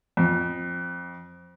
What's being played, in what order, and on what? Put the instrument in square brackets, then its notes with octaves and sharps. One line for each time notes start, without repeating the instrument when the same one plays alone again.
[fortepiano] F2